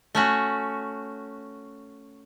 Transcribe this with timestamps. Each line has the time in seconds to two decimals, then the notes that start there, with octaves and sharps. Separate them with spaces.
0.15 A3 C#4 F#4